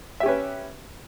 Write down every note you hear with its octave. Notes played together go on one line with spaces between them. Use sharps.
C#4 G4 B4 E5